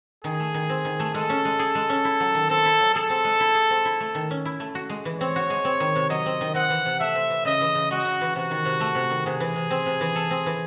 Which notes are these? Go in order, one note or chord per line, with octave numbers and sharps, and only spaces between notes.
D#3 G#4
A3
D#3
C4
D#3
A3
G#3 A4
C#4
G#3
G#4
G#3
C#4
E4
F#3
D#3
C4 A4
E4
F#3
G#4 A4
C4
G#3
E4
G#4
C4
E4
A3
D#3
C#4
E4
A3
F#4
G#3
E3
C4 C#5
F#4
G#3
C4
D#3
C3
F#3 D#5
C4
D#3
C4 F#5
E3
C3
A3 E5
C4
E3
C#3 D#5
E3
C#3
G#3 F#4
C#3
E3
C3 F#4
D#3
C3
A3
C3
D#3
C3 G#4
E3
C3
C4
C3
E3
A4
C4
E3